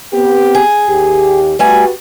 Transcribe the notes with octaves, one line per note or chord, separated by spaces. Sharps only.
B3 C4 G4
G#4
D#2 G4
G3 A3 F#4 G4 B4 G#5